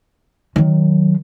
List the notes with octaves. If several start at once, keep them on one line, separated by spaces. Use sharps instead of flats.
D#3 F#3